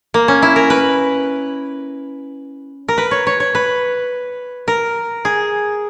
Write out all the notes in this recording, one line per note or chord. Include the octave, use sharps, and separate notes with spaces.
A#3
C#4
E4
A#4
B4
A#4
B4
C#5
C#5
C#5
B4
A#4
G#4